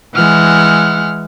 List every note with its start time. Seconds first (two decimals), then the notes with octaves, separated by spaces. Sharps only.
0.15 E3 G#3 F#5 F6